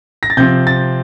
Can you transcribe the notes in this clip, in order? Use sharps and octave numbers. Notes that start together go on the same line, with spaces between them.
A#6
A6
C3 F3 C4 G6
A6